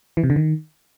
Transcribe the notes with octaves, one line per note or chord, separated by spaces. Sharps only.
E3
C3
D3
D#3